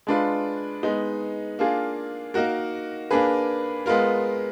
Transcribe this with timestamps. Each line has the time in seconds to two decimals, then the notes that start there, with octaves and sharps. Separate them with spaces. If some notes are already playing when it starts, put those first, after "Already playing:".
0.07 G#3 D4 F4 B4
0.83 G#3 B3 D#4
1.59 A#3 D4 F4 G#4
2.34 A#3 D#4 F#4 A#4
3.11 A#3 D4 G#4 B4
3.86 G#3 B3 F4 A#4